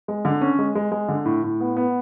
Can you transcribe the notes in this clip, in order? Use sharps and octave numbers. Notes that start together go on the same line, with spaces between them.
G#3
D3
C#4
G#3
G#3
G#3
D3
A2
A2
B3
B3